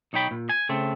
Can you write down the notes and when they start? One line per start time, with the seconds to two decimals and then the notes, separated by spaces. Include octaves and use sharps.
0.13 B1 D#4 C#5 G5 B5
0.31 A#2
0.49 G#5
0.69 C#3 A3 C4